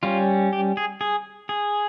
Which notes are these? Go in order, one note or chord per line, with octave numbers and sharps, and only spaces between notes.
G3 C#4 F4
G4
G#4
G#4
G#4